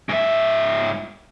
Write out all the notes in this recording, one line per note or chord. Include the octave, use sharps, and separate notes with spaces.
G#2 E5